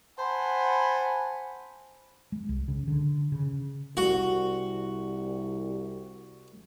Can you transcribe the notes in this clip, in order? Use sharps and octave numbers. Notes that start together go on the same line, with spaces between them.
C5 F#5 G#5 A5 B5
G#3
C2
C#3
D3
C#3
C2 F#4